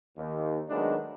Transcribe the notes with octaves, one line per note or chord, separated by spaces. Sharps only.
D#2
D#3 F#3 G#3 A3 B3 D4